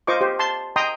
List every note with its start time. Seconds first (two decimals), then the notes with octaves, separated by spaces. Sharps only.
0.07 F4 C5 D#5 C#6 D6
0.21 G4 C5
0.39 A5 C6
0.76 D#5 G5 A#5 C6 D#6